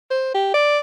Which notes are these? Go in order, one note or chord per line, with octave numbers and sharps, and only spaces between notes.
C5
G4
D5